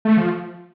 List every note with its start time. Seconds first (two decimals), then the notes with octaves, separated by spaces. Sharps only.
0.05 A3
0.17 F3